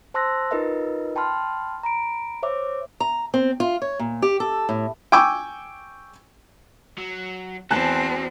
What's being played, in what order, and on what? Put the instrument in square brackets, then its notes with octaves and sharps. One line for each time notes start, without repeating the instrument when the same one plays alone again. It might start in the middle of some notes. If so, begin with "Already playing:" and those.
[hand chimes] C5 A5 C6 E6 F#6 A#6
D#4 F4 A#4 B4 D#5 E5
G5 A5 B5 C6 F6
A#5 B5 D7
C5 C#5 E5 D6
[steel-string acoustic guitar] A#5
C4
F4
C#5
A#2
G4
A4
A2
[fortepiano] G5 G#5 C#6 D6 E6
[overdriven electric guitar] F#3
[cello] E2 C4 [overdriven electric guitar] F#4 C5 [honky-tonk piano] G#5 A5 F#6